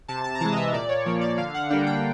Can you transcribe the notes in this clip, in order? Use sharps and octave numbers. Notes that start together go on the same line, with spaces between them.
C3 A5
A5
A#5
E3 G#3 A5
D#5
E5
A#2 D5
C#5
F3 A#3 C#5
D5
D3 F5
F#5
G3 A#3 D4 G5
G5